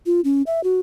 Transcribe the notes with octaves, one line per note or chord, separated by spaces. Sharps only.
F4
C#4
E5
F#4